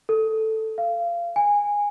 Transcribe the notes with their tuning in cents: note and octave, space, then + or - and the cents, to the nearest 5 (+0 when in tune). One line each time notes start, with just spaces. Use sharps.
A4 +5
F5 -25
G#5 -15